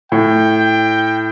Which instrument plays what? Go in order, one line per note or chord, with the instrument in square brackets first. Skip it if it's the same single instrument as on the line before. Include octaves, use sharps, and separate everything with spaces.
[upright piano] A2 [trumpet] G5